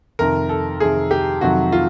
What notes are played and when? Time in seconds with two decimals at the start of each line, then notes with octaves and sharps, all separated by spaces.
0.19 F2 C3 D#3 A#4
0.49 A4
0.80 F2 C3 D#3 G#4
1.11 G4
1.41 F2 C3 D#3 F#3 F#4
1.72 F4